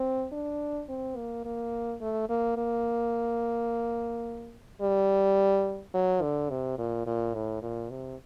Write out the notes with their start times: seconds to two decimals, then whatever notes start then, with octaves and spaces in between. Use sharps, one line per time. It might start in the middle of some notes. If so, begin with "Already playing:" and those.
Already playing: C4
0.32 D4
0.89 C4
1.17 A#3
1.45 A#3
2.01 A3
2.29 A#3
2.57 A#3
4.81 G3
5.94 F#3
6.22 D3
6.50 C3
6.78 A#2
7.06 A#2
7.34 A2
7.62 A#2
7.90 C3